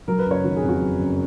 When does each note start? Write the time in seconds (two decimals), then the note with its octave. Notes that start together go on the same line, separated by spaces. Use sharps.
0.08 F#3 A#4
0.19 B4
0.26 F#1
0.31 C#5
0.44 D#3 F#4
0.56 G#4
0.62 F2
0.69 F#4
0.80 F#3
0.99 F#1